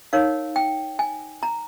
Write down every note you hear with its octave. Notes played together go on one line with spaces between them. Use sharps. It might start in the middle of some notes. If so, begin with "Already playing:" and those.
D#4 A#4 C#5 F5
G5
G#5
A#5